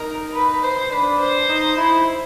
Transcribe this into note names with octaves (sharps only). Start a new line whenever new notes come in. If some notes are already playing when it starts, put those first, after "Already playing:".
Already playing: D#4 A#4
B4
C5
D4 B4
C5
D#4
E4